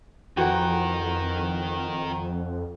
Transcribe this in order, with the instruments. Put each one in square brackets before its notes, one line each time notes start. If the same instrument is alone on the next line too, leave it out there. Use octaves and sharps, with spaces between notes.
[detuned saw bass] F2 [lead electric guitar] D#3 A#4 [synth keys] E3 F#4 [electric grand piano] F#5 G5